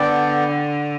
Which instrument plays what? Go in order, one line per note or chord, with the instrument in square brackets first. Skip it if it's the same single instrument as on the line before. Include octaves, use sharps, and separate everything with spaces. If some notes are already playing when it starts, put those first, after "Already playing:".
Already playing: [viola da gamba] D3 [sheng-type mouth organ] B3 D4 A4 D5 G5